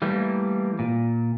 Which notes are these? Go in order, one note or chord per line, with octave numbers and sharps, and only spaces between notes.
E3 G3 A3 A#3
A#2